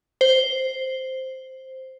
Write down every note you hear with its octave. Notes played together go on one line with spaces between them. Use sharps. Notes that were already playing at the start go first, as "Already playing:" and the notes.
C5